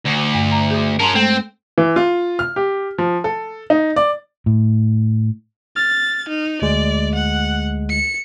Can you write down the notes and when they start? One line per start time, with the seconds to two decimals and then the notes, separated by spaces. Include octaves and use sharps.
0.06 D2
0.34 G2
0.52 A#5
0.71 G#4 D#6
0.99 C#4 A#4 A5 A#5 C6
1.15 G#3 A3 C4 A4
1.78 E3
1.96 F4
2.39 F6
2.56 G4
2.98 F3
3.24 A4
3.70 D#4
3.96 D5
4.46 A2
5.76 F6 A6
6.29 D#4
6.62 D2 G#3 D5
7.15 F#5
7.90 C#7